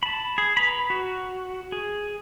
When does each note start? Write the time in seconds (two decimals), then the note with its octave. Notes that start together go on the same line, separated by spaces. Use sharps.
0.03 A5 B5
0.38 G#4
0.57 B4 A#5 B5
0.90 F#4
1.72 G#4